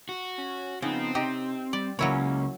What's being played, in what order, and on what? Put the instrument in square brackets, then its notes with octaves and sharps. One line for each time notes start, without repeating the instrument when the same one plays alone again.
[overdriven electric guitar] F#4
[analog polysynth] C#4
[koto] C#3 [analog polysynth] F3 B3 D#4 [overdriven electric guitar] C4
[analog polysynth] C3 [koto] D#4 G4
[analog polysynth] G3 [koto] D5
[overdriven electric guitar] C#2 [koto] F#3 E4 C#5 [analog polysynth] A#3 C#4